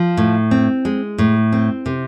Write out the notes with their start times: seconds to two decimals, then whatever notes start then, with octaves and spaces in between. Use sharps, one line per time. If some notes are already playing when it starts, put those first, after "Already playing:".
Already playing: F3
0.17 A2
0.51 C4
0.85 G#3
1.18 A2
1.52 C4
1.86 C3